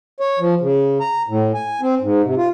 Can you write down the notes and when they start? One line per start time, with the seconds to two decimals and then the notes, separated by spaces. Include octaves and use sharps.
0.20 C#5
0.39 F3
0.61 C#3
1.01 A#5
1.28 A2
1.54 G#5
1.81 C4
2.01 G#2
2.24 C3
2.37 F4